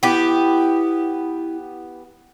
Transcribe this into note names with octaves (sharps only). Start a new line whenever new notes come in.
B3 E4 G4